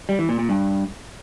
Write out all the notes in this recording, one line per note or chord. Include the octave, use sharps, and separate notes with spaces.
G3
E3
A#2
A#2
G2